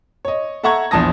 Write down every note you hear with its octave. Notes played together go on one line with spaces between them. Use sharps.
C#5 D#5
A4 E5 F#5 A#5 C#6 G#6
A#1 E2 F3 A5 D#6 A#6